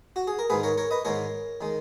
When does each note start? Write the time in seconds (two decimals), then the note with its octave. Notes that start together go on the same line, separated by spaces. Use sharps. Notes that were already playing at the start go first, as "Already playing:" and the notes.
0.16 F#4
0.27 G#4
0.39 A#4
0.50 G#2 D#3 G#3 G#4 B4
0.63 A#4 C#5
0.78 A#4 C#5
0.91 B4 D#5
1.05 G#2 D#3 G#3 A#4 C#5
1.61 D#3 G#3